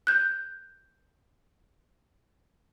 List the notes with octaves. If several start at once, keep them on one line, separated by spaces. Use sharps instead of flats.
F#6 G6